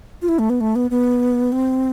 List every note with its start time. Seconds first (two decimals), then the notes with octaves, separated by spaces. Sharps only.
0.22 F4
0.28 E4
0.39 A3
0.50 B3
0.60 A3
0.75 B3
0.90 B3
1.52 C4